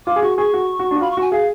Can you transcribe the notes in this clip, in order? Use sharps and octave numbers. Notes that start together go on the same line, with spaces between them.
F4 D6
G#4
F#4 C#6
G#4 C#6
F#4
F#4
D4
F#4
F4 B5
C#6
F#4 G#5
G#4 F5